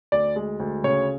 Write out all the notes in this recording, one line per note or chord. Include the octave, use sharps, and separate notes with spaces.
D2 D5
G#3
D2
C#3 C#5